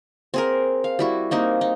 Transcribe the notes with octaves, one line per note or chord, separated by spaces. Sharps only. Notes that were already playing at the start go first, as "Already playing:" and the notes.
C4 G#4 A#4
F5
G3 E4 F#4
A#3 C4 D#4
D#4